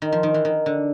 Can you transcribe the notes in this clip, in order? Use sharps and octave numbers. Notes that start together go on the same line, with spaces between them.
D#3
F3
D#3
E3
D#3
D3